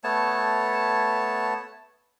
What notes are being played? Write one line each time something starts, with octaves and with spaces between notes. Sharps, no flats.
A3 B3 C#5 A5